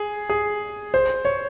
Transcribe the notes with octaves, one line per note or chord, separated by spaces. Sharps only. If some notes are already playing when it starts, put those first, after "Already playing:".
Already playing: G#4
G#4
C5
C#5